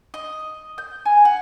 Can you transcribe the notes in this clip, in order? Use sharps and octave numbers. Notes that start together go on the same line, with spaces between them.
D#5
G6
G#5
F#5